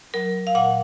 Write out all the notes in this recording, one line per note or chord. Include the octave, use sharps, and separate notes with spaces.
F#3 A#4
F5
A#2 F#5